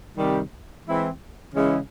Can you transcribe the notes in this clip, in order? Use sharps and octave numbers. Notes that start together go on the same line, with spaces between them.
C3 D#3 G3
E3 G#3 C4 E4
C#3 E3 G#3 C#4 E4